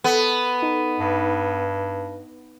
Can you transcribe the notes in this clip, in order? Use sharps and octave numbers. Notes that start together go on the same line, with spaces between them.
B3 A4
D#4
G2